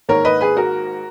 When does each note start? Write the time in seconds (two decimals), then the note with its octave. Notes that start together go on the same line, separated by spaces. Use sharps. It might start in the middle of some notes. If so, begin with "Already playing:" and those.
0.09 G#2 D#3 A#3 A#4 C#5
0.25 B4 D#5
0.41 G#4 B4
0.57 F#4 A#4